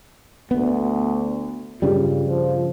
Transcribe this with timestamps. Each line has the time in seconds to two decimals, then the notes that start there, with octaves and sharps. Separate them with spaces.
0.51 D2 B3
1.82 G2 C#3 G3 F4
2.26 F3